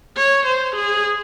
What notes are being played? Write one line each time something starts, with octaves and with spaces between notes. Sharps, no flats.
C#5
C5
G#4